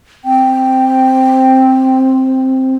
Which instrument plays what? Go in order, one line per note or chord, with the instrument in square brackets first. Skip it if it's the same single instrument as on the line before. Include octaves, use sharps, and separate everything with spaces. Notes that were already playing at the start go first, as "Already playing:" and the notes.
[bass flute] C4 [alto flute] G5